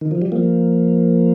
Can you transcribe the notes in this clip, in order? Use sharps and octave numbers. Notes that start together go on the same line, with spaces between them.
D#3
F3
G3
F3 A#3